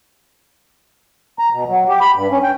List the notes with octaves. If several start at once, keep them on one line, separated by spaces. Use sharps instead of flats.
A#5
B2
F#3
G4
B5
G2
C#4
G5